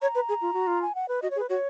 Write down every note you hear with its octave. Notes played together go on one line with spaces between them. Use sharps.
C#5 A#5
B4
G#4
F4
F#4
F4
G#5
F#5
B4
F#4 D#5
C#5
G#4
B4
F#4 C#5